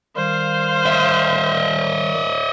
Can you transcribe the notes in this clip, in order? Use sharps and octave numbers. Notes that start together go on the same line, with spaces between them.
D#3 G3 C5 F5
D#5 E5